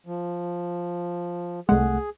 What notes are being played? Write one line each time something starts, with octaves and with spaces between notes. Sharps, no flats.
F3
C2 G#3 A3 G#4 F#5